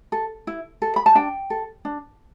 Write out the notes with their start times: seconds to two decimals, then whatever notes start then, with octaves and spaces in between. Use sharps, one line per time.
0.12 A4
0.47 E4
0.82 A4
0.96 B5
1.06 A5
1.15 D4 G5
1.50 A4
1.85 D4